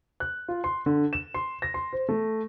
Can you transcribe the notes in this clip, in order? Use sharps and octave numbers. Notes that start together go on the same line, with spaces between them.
F#6
F4
C6
D3
E7
C6
A#6
C6
C5
A3